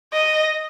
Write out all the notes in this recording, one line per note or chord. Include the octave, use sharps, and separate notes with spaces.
D#5